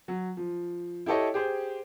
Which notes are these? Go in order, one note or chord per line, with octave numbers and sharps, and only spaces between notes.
F#3
F3
E4 G4 A4 C#5 D#5
G4 G#4 C5